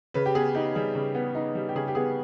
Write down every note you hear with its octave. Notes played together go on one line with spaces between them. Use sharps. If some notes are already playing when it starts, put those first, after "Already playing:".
C#3 B4
G4
B3 G#4
D#4 G4
G3 G#4
C#3
B3
D#4
G3
G4
C#3 G#4
G4
B3 G#4